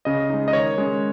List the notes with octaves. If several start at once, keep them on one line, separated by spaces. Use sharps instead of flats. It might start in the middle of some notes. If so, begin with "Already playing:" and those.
C#3 D#5
G#3 D#4
D#5
D#3 C#5
G#3 C#4